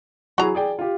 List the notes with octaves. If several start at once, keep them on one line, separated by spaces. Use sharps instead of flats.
F#3 E4 F#4 G#4 A#5
G#4 D5 G5
F4 G4